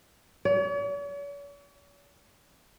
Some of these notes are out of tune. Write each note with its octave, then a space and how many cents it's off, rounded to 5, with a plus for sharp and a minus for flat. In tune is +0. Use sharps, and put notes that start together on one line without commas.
C#5 +45